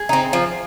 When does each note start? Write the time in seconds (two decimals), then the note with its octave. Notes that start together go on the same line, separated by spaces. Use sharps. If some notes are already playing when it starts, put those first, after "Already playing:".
Already playing: G#4
0.09 C4 D#4
0.33 F3